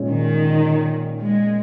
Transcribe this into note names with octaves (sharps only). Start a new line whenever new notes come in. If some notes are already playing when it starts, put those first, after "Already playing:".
Already playing: A#2 G#3 C#4
D#3
G#3